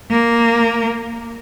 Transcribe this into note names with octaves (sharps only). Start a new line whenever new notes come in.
A#3